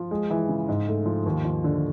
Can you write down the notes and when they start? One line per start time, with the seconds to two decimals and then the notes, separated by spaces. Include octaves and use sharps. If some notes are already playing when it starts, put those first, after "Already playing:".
Already playing: F3
0.11 G#3
0.30 E3
0.49 C#3
0.68 G#2
0.88 A3
1.06 F3
1.26 D#2
1.45 F3
1.64 D3